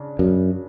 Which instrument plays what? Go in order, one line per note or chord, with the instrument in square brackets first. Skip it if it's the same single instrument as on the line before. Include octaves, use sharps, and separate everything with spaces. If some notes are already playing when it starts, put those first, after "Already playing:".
Already playing: [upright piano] C#3 D4
[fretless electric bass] F#2